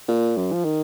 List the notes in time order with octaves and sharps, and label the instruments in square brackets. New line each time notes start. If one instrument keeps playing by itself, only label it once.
[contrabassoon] A#2
F#2
F3
D#3